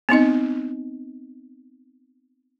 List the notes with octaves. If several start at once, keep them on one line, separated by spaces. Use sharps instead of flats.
B3 C4 D#4 D#5